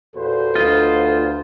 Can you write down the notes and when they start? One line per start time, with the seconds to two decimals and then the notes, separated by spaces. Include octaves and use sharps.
0.15 E2 A#2 F#4 A4 B4 C5
0.55 D2 F4 D#5